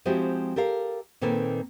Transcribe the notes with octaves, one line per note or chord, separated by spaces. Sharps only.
F3 G#3 C4 E4 F#4 G4
G4 A4 A#4 F5
A#2 D#3 A#3 C4 A4 B4